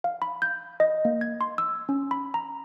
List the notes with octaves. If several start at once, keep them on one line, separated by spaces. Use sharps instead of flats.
F5
B5
G6
D#5
A#3
G#6
C6
E6
C#4
B5
A#5